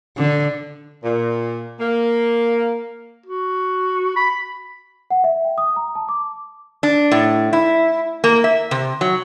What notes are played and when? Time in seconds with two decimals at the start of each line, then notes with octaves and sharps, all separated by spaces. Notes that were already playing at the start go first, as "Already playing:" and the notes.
0.17 D3
1.03 A#2
1.80 A#3
3.26 F#4
4.16 B5
5.11 F#5
5.24 E5
5.45 G5
5.58 D#6
5.76 A#5
5.95 A5
6.09 D6
6.83 D4
7.12 A2
7.53 E4
8.24 A#3
8.44 E5
8.71 C3
9.01 F#3